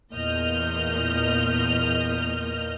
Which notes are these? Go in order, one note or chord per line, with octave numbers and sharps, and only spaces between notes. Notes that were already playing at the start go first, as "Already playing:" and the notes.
E2 A#2 D#5 F6 G6